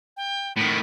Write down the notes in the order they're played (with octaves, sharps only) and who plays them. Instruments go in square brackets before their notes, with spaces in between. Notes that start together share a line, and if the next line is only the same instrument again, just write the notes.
[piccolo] G5
[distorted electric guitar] A2 D#3 [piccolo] B6